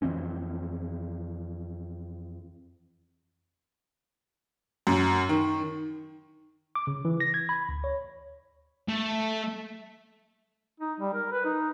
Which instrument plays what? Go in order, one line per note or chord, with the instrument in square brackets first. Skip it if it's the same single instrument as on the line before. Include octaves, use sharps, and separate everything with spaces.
[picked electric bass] F2 E3 C4 C#4
[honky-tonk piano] F#2
D#3
[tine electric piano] D6
C#3
E3
A#6
G#6
B5
D2
C#5
[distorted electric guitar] A3
[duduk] D#4
G3
A#4
B4
D#4